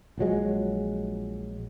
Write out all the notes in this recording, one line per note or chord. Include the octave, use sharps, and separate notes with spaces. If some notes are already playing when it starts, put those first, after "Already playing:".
A#1 F3 F#3 G#3